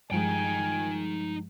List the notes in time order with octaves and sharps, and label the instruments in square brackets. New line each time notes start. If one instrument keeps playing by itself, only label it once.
[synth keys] G2 F3 G#3 [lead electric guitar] D#4 G5 [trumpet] G#5